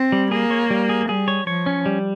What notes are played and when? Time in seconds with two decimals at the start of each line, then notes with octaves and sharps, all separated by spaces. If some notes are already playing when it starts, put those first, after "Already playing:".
Already playing: C4
0.12 G3
0.31 A#3 G#4
0.51 C#5
0.70 G3
0.89 G#4
1.09 G3 G#4
1.28 C#5
1.47 F3 C#5
1.66 C#4
1.86 G3